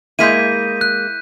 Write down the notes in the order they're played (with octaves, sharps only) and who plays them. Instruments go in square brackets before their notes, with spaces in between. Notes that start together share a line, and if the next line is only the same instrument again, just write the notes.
[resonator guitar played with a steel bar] G#3 A#3 E4 [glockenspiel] G6 B6 D#7
[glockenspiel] F#6